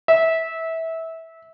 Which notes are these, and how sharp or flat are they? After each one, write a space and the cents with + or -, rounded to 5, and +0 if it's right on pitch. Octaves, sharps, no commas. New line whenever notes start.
E5 -20